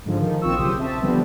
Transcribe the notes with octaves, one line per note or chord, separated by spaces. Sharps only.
G#2 D3 F3
D#3 F3
A#1 C4 F4 C#6 E6
B1 C#3 G4 C5 D#6 E6
C4 E5 A5
D3 F3 G3 B3 C4